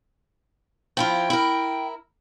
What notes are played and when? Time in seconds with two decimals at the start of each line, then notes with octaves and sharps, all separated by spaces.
0.97 F3 E4 F4 G5
1.30 E4 A#4